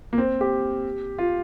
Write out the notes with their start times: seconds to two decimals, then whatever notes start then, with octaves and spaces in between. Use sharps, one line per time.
0.13 A#3
0.18 C4
0.41 G4
1.19 F4